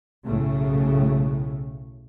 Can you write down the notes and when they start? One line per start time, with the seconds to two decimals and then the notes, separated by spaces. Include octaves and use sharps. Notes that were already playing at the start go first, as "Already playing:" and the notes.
0.25 B1 A2 C#3 A3